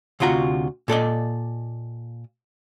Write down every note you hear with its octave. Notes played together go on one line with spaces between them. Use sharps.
D2 C3 F4 F#4 A#5
A#2 A4 D5 D#5